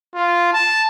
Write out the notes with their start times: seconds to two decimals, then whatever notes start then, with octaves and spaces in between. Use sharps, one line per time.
0.15 F4
0.53 A5